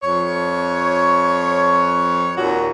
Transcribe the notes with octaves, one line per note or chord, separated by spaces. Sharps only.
F2 C#5
D#2 A#2 F#4